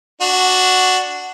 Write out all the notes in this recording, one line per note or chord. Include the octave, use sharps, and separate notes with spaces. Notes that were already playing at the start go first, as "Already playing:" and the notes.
D4 F#4